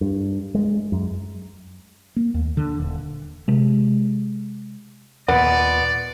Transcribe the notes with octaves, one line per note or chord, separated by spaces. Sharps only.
G2
G#3
F#2
A#3
D#2
D3
D#1
C3 G#3
D#2 A#2 B3 D5